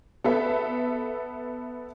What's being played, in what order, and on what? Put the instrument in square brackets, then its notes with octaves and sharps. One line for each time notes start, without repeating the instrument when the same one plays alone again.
[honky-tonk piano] B3 A4 E5